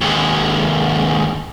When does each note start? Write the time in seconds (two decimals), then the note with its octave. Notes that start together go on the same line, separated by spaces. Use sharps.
0.01 D#2 G#3